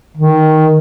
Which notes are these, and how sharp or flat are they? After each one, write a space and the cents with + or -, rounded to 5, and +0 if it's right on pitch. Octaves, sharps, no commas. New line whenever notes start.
D#3 +5